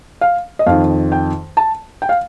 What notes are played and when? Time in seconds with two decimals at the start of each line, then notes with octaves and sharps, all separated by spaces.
0.21 F5
0.59 D#5
0.66 F2 D#3 F5
1.12 G5
1.57 A5
2.02 G5
2.09 F5